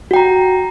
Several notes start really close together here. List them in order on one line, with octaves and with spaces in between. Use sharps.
F#4 G5 A#5